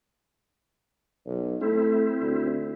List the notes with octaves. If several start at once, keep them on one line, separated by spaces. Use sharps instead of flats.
B1
A3 C4 E4
D2